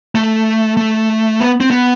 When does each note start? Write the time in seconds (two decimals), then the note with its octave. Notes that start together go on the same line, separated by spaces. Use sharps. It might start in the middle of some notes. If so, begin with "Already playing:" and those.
0.15 A3
0.77 A3
1.40 B3
1.61 C4
1.71 B3